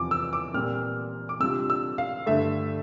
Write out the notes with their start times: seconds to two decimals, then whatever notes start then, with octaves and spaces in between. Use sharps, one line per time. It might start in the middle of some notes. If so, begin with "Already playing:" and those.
Already playing: E2 C3 F3 D6
0.11 E6
0.33 D6
0.54 A#2 G3 C4 F6
1.29 D6
1.40 C3 G3 D4 F4 E6
1.70 E6
1.98 F5
2.26 G2 D3 A3 E5